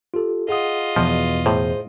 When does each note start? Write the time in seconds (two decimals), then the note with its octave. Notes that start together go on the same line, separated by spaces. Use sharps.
0.14 F4 G4 A4
0.49 F4 G#4 D#5 F#5 D#6
0.96 E2 B2 F3
1.46 A2 G#4 C5